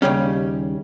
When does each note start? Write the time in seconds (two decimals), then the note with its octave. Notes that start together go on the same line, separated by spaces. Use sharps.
0.02 D#2 C#3 G3 C#4